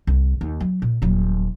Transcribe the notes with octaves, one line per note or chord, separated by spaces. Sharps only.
C2
D#2
F#3
A#2
D#1 F#3